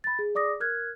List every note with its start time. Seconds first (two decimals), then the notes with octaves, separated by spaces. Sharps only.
0.04 B5 A6
0.19 G#4
0.35 G#4 D5 D6 D#6 A#6
0.60 A#4 F6 F#6 G#6